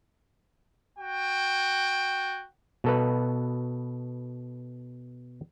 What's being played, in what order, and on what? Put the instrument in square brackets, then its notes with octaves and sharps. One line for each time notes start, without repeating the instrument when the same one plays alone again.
[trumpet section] F#4 G5
[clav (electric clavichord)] B2 A4 B4